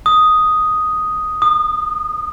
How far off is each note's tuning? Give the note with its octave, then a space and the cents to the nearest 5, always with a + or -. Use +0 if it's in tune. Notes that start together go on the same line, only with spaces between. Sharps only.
D#6 +0
D#6 -30